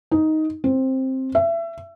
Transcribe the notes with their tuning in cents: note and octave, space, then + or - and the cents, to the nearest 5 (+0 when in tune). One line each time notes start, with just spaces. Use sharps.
D#4 +10
C4 +10
E5 +25